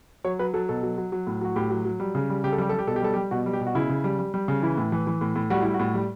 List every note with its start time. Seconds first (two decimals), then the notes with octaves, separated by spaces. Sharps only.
0.25 F#3 C#5
0.39 F#3 B4
0.54 F#3 A4
0.69 B2 A4
0.83 F#3
0.98 F#3
1.12 F#3
1.27 A2
1.41 F#3 F#4
1.56 A2 G4
1.71 F#3
1.85 F#3
2.00 G3
2.15 C#3
2.29 G3
2.44 C#3 G4
2.52 A4
2.58 G3 G4
2.69 G3 A4
2.79 G4
2.87 B2 A4
2.96 G4
3.02 G3 A4
3.14 G4
3.17 G3
3.31 B2 F#4
3.46 G3
3.53 G4
3.61 B2
3.66 F#4
3.75 C#3 E4
3.89 C#3
4.04 G3
4.19 G3
4.34 G3
4.48 C#3
4.63 E3 E4
4.77 A2
4.92 E3
5.07 E3
5.21 A2
5.35 A2
5.50 G3 F#4
5.62 G3 E4
5.74 F#4
5.79 A2
5.94 G3